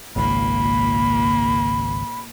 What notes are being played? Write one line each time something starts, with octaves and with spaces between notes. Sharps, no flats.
G#1 C#2 A#2 A#3 B5